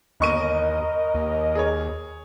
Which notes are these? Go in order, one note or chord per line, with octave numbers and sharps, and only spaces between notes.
G1 D#2 A#4 D#5 C#6 D#7
D#2
G#4 C#5